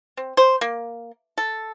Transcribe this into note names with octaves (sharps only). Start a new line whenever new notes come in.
C4
C5
A#3
A4